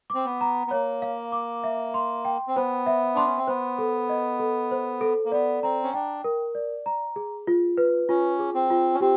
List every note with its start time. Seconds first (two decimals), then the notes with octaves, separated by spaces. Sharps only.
0.10 C4 D6
0.25 B3
0.41 A#5
0.67 B3
0.71 A#3 C#5
1.02 F5
1.32 D6
1.64 E5
1.94 C6
2.25 G5
2.47 C4
2.56 B3 C5
2.86 E5
3.15 D4 C6
3.26 C#4
3.37 C4
3.47 B3 C5
3.78 A4
4.09 D#5
4.40 A4
4.71 C5
5.01 A4
5.25 A#3
5.32 B3 D5
5.63 C4 A#5
5.83 C#4
5.94 D4 G5
6.24 A#4
6.55 D5
6.86 A#5
7.16 G#4
7.47 F4
7.77 B4
8.09 C#4 F4
8.39 G#4
8.54 C4
8.70 F4
8.94 C#4
9.00 C4 G4